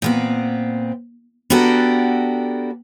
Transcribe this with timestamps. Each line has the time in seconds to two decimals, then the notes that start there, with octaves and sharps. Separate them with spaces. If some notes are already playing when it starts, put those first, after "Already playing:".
0.02 A#2 B3 C4
1.50 B3 D4 F#4 G4 A4 A#4